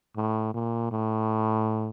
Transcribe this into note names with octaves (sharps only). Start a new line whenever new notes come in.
A2
A#2
A2